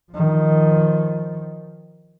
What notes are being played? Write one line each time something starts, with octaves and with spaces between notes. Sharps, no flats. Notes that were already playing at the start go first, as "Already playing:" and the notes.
D#3 F3